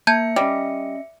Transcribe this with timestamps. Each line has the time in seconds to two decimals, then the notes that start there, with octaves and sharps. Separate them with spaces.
0.07 A#3 E5 A5 G6 G#6 C#7
0.36 G3 C#4 D#5